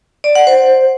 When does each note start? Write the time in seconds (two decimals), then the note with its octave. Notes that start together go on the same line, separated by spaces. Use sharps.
0.24 D5
0.35 F#5
0.47 C5